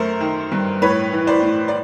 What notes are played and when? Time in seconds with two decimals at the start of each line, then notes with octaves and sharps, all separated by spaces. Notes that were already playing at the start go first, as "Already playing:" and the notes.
Already playing: F#2 A3 A#4 C5
0.21 D#3
0.52 G2
0.82 A2 B4 C#5
1.12 E3
1.27 C5 D5
1.42 A2
1.68 D5